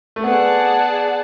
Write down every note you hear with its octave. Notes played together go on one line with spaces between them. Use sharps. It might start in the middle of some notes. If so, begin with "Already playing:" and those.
A3
B3 G#4 D5 F#5 A5